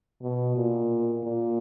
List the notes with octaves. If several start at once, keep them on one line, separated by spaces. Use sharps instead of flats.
B2
A#2
A#2